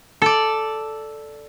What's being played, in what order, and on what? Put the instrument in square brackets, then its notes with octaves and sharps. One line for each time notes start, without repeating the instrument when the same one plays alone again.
[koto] A4 D5